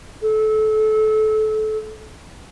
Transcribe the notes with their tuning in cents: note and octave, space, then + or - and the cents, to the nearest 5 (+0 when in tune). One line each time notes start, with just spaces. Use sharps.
A4 -25